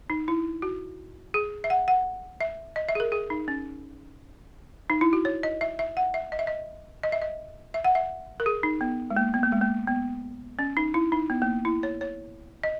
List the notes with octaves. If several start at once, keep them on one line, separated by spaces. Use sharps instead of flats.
D#4
E4
F#4
G#4
E5
F#5
F#5
E5
D#5
E5
G#4
A#4
G#4
D#4
C#4
D#4
E4
F#4
C#5
D#5
E5
E5
F#5
E5
D#5
E5
D#5
D#5
E5
D#5
E5
F#5
E5
A#4
G#4
D#4
B3
G#3
A#3
B3
A#3
G#3
A#3
B3
C#4
D#4
E4
D#4
B3
A#3
E4
C#5
C#5
D#5